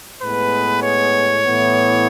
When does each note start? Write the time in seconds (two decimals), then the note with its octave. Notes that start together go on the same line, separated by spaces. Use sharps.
0.22 A2 G#3 B3 B4
0.83 C#5
1.44 A2 E3 B3